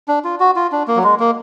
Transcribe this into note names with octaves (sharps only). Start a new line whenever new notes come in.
D4
F4
F#4
F4
D4
A#3
F#3
G#3
A#3